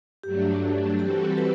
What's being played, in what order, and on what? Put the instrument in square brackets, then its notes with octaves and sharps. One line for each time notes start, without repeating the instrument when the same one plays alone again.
[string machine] G2 F#3 A3 D4 [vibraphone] G4
[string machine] E3 G3 C4 F#4 A4 [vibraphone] G4
[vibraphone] B4